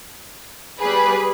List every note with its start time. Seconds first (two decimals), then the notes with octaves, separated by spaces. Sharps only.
0.80 G3 G#4 B4